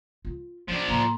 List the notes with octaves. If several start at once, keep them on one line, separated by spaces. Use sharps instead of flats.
F4
F3 C#4 D5
A2 A#3 A#5 C6